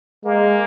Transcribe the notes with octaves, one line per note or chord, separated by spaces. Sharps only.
G#3 A#3